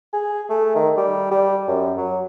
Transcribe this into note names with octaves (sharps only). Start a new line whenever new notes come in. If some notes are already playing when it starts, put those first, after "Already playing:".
G#4
A3
D#3
G3
G3
F#2
F#3